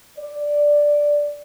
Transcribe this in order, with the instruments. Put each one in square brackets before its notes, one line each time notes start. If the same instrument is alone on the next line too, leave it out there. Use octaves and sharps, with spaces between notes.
[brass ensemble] D5